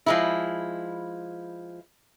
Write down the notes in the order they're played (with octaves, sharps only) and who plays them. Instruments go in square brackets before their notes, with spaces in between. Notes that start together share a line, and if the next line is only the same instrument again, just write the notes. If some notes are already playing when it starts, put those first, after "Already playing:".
[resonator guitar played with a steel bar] F3 G#3 E4